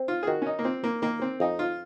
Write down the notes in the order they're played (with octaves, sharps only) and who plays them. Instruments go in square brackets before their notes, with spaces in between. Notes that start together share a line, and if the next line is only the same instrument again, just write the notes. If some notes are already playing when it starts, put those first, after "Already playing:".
Already playing: [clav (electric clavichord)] C4
[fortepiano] F4
G#4
[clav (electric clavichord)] D#3 [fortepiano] F#4
[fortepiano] C#4
D#4
A#3
[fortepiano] C4 [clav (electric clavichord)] F4
[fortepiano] A#3
[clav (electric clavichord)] D#3 [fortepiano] A#3
[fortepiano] C4
[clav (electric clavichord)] F2 [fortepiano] D#4
[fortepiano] F4